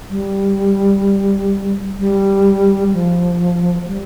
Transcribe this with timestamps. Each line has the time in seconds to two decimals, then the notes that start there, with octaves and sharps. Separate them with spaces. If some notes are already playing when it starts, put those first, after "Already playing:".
0.10 G3
1.99 G3
2.93 F3
3.87 G3